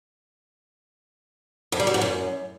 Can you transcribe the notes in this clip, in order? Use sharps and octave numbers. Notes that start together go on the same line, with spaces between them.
F2
G3
F#3
G#2
F#2